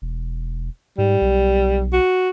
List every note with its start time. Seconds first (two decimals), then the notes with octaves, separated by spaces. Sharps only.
0.02 E1
0.98 G#2 G3
1.21 B1
1.93 F#4